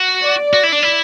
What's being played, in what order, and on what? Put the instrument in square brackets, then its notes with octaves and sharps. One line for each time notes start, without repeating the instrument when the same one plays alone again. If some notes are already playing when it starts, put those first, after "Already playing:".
Already playing: [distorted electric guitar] F#4
[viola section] D5
[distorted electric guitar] F#4
E4
D4
E4